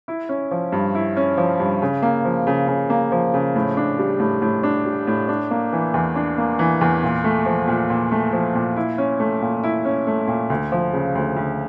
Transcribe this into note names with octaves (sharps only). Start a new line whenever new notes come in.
E4
C#4
F3
G2
E4
C#4
F3
G2
C#3
A#3
F3
C#3
C#3
A#3
F3
C#3
A2
D4
G3
A2
A2
D4
G3
A2
D4
A#3
E3
E2
D4
A#3
E3
E2
A#2
A3
F3
A#2
A#2
A3
F3
A#2
E4
C#4
A3
A#2
E4
C#4
A3
A#2
D2
F3
C#3
D2
D2